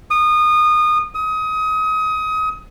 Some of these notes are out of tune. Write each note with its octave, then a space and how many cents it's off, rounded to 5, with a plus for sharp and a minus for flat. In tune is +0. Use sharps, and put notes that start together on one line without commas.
D#6 -25
D#6 +25